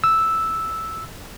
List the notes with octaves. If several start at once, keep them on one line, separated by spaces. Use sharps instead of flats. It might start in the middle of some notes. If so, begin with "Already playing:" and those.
E6